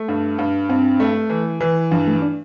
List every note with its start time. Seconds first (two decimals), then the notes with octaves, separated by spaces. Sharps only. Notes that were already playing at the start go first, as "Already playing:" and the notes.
Already playing: A3
0.08 G2
0.39 G2
0.69 G2 C4
1.00 A3
1.30 E3
1.61 E3
1.91 G2 F3
2.07 A3
2.22 D4